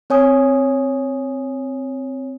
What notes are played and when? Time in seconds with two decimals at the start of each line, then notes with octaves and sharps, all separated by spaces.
0.10 C4 C#5 G#5 D#6